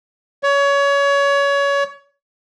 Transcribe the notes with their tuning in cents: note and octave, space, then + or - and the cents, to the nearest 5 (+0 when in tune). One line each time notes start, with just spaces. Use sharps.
C#5 +25